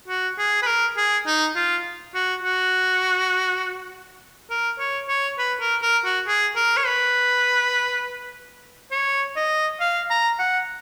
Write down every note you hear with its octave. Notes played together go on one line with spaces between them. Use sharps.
F#4
G#4
B4
A#4
G#4
D#4
F4
F#4
F#4
A#4
C#5
C#5
B4
A#4
A#4
F#4
G#4
A#4
C#5
B4
C#5
D#5
F5
A#5
F#5